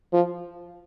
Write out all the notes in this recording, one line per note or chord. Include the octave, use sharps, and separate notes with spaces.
F3